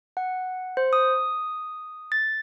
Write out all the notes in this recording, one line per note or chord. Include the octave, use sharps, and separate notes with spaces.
F#5
C5
D#6
A6